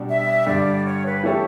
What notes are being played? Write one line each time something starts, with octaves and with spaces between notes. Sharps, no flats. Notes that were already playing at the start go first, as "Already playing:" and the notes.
Already playing: B2 G3 D4
E5
G2 D3 G3 D5
C#5
B4
E3 A3 C#4 G4 A4